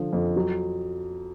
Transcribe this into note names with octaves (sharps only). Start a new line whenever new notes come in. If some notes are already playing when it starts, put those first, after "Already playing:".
Already playing: D3 F3
F2
F#3